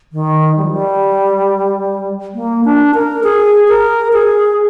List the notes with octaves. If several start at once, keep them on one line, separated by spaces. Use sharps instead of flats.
D#3
G3
F3
G3
A#3
D4
A#4
G#4
A#4
G#4